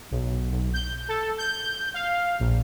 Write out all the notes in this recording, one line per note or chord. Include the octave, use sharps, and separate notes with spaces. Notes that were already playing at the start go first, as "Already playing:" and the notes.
B1
B1
G6
A4
G6
F5
A#1